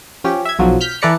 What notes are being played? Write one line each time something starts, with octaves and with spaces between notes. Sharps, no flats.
F3 C#4 G4
E5 G#6
B1 F3 F#3
F6 G6 B6
E3 A4 B4 D5 A#5 C#7